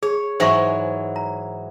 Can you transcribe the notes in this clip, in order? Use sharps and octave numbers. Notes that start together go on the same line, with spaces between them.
G#4 C#5
G#2 E3 F#3 C5 E5 C#6
A#5